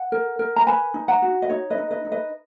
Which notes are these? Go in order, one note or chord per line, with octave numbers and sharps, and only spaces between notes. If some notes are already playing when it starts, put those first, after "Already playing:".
Already playing: F#5
A#4
A#4
A#5
B4 G#5 B5
D#4
F#5 A#5
F#4
D#5
D#4 C#5
B4 D#5
D#4
B4 D#5
D#4
B4 D#5